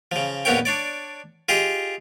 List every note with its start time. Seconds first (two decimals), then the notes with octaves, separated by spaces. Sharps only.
0.12 C#3 F3
0.45 A#1 F2 B3 A#4 C#5 G5
0.65 D4 C#5 D5
1.49 F4 G4 G#4 D#5